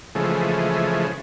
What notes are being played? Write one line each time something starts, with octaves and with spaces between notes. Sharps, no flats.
C#3 E3 F3 G#3 A3